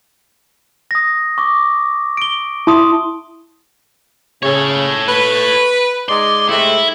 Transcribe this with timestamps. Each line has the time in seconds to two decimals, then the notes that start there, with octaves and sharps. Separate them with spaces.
0.91 D#6 A#6
1.38 C#6 D6
2.17 D7 G7
2.67 E4 A5 C6 D#6
4.43 C#3 A4 C#5
5.07 B4
6.09 G#3 D#4 D5 C6
6.49 C3 G#3 A3 E4